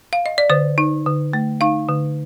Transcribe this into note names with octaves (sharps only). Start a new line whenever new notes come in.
F5
D#5
D5
D3 C5
D#4
D3
A3
D#4 F5
D3